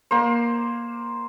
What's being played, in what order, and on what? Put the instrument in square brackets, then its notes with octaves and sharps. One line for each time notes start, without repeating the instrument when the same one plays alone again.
[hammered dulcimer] A#3 C5